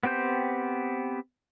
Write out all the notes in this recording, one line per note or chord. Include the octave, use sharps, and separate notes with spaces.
B3 C4 G4 C5 G6